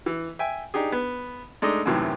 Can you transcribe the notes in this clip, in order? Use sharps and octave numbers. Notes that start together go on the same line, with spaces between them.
E3
E5 G5 G#5
D4 D#4 G4 G#4
B3
G#3 A3 D4 D#4 D5 D#5
F#2 A2 C3 D#3 E3 F#3